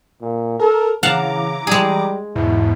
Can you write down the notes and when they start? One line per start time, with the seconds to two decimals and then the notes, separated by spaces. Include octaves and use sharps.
0.22 A#2
0.60 A4 A#4
1.03 C#3 E3 F5 F#5 A5 A#5 D6
1.67 G3 G#3 G#4
2.36 E2 G#2 B2 E4